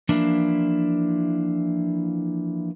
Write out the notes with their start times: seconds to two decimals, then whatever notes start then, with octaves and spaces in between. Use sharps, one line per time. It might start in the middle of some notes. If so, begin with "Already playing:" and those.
0.09 E3 F3 A#3 D4 E4